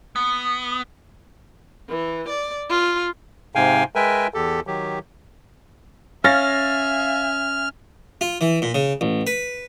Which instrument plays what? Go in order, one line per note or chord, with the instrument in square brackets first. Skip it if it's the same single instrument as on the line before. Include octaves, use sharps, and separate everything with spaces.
[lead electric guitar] B3 [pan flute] D#6
[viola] E3
D5
F4
[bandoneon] G#2 C3 F5 G5 G#5
G#3 A#4 B4 E5 G5 G#5
E2 G4 A4
D#3 F#3 G4
[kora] C#4 [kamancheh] E5 G#5 [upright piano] F5 A6 A#6 [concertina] F6
[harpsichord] F4
E3
A#2
C#3
A1
B4